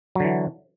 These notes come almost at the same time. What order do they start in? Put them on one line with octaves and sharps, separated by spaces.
F#3 D3 E3